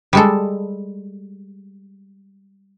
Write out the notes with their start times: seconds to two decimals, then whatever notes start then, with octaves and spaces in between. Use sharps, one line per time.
0.13 G3 G#3 A4